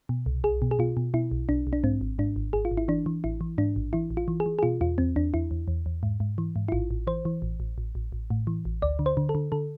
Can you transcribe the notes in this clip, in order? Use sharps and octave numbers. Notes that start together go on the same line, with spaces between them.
B2
C2
B1 G#4
B2
G#4
B2 F4
B2
B2 E4
B1
B1 D4
B1
D4
G#2 C4
G#1
G#2 D4
G#1
G#1 G#4
F4
G#1
E4
E3 D4
E3
A1 E4
E3
G#2 D4
A1
E3 E4
A1
F4
E3
G#4
E3
G#4
B2 F4
E2 F4
E2 C4
E2 D4
E2 E4
E2
E2
E2
G#2
G#2
E3
G#2
E4
A1 F4
A1
E3 C5
E3
A1
A1
A1
A1
A1
A2
E3
A1
D2 D5
D3
C5
D3
A4
D3
D3 A4